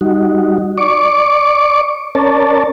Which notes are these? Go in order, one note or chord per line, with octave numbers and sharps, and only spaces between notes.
G3 D#4 F#4
D5 C#6 D6
C#4 A#4 C#5 D5 A5